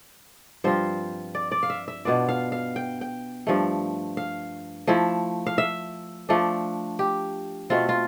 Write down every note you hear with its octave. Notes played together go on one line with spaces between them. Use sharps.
G2 F3 C4 F4 C5
D5
D5
F5
E5
E5
B2 B3 D4 F4 D5
F5
F5
G5
G5
G2 F3 A3
F5
F3 A3 E4
F5
E5
F3 A3 D4
G4
B2 A3 C4 F4
F4